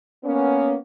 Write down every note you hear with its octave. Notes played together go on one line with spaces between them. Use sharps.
A#3 B3 C#4